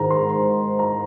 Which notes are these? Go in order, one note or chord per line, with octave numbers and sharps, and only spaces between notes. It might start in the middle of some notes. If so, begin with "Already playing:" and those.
Already playing: G#2 D#3 G#3 A#5
C6
A#5